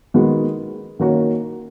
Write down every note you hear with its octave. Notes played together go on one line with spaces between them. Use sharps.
D#3 G#3 B3 F#4
D#3 A#3 C#4 F#4 A#4